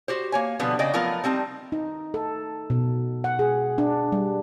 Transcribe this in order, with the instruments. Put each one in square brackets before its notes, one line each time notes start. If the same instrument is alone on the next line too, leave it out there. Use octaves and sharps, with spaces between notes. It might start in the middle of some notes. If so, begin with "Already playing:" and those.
[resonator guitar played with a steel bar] F#4 G4 C5
A#3 C#5 G#5
B2 D3 F3 G3 B3
C#3 D5 D#5 G5
F3 F#3 A3 B3 F4 A#4
G3 C4 D#4 A5
[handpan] D#4
A4
B2
F#5
G#4
D4
G3